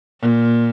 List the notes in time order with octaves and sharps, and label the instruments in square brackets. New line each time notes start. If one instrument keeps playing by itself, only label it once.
[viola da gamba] A#2